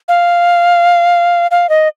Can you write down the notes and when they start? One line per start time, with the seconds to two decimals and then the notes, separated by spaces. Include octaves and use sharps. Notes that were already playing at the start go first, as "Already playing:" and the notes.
0.08 F5
1.51 F5
1.69 D#5